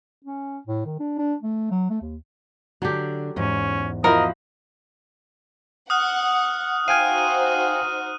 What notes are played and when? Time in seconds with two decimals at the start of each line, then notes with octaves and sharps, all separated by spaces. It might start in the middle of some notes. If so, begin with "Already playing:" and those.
0.24 C#4
0.67 A2
0.86 D#3
1.00 D4
1.19 D4
1.43 A3
1.71 F#3
1.90 A3
2.02 D#2
2.82 D3 F#3 D4 G4
3.36 E2 G#2 C#4
4.04 F3 E4 F#4 A#4 D#5
5.90 F#5 D#6 F6 F#6
6.88 D#4 F#4 C5 F5 G5 G#5 F6 D#7